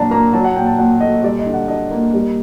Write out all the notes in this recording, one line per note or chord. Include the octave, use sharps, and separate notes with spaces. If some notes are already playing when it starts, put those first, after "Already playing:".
Already playing: A#2 F#3 D4 A5 A#5
A#3 A#5
F#3 A5
F#5
A#2 G5
A5
A#2 F#5
A3 D#5
G3 D5
D#5
D3
F#5
D4 D#5
A#3
G3